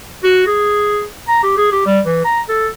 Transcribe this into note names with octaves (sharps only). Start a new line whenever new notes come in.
F#4
G#4
A#5
G4
G#4
G4
G3
E3
A#5
A4